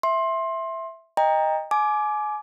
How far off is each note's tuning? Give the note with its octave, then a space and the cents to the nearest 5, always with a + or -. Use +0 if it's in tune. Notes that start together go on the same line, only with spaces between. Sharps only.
E5 +0 C6 +20
D#5 +0 G5 +30 A#5 +0
G#5 +30 D6 +0